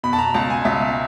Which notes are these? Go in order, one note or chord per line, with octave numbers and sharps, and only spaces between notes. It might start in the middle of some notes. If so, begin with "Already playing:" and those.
B2 B5
A5
A#5
C#2 A5
G#5
C#2 E5